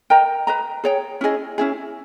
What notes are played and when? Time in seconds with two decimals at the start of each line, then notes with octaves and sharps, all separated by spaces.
0.10 A#4 D#5 G5 A#5
0.47 B4 D#5 A#5
0.84 G#4 C#5 G5
1.21 C#4 E4 G#4 D#5
1.58 C#4 E4 G#4